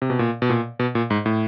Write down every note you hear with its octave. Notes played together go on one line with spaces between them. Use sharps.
C3
B2
A#2
B2
A#2
B2
A#2
G#2
A2